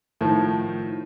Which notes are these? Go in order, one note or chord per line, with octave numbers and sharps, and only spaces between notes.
A2 D#3 F3